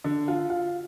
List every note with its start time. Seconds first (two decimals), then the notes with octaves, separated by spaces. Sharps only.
0.04 D3
0.28 F4
0.50 F4